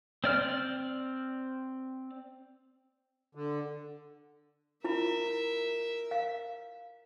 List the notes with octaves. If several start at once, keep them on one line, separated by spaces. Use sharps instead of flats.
C4 D5 F6
D3
E4 F4 A#4 E5 B5
F5